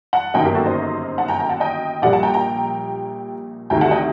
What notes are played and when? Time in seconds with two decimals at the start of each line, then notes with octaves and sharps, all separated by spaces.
0.13 F#5 A5
0.34 G1 F#2 D#3 F#3 A#3 D#5 G5
0.44 G4 A#4
0.55 F#4 A4
0.66 C5 D#5
1.18 F#5 A5
1.28 G5 A#5
1.39 G5 A#5
1.49 F#5 A5
1.60 D#5 G5
2.02 A#1 A#2 G3 A#3 D5 F#5
2.13 F#5 A5
2.23 G5 A#5
2.34 G5 A#5
3.70 D2 C3 D#3 A3 G5 A#5
3.81 F#5 A5
3.91 D#5 G5